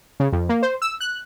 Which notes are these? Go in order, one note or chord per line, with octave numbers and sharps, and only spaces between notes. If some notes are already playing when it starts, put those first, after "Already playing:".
C#3
F2
A#3
C5
E6
F#6